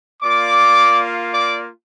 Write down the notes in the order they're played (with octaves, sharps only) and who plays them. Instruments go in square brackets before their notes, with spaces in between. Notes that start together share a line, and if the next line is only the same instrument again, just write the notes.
[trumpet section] A#3 F4 D5 D6
D5 D6